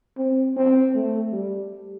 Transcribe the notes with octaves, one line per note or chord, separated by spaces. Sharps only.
C4
C4
A3
G3